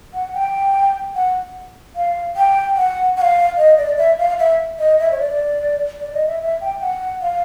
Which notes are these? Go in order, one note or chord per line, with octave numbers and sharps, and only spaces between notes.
F#5
G5
F#5
F5
G5
F#5
F#5
F5
D#5
D5
E5
F5
E5
D#5
E5
C#5
D5
D5
D#5
E5
E5
G5
F#5
F5